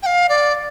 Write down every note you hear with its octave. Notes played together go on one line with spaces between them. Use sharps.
G5
F5
D5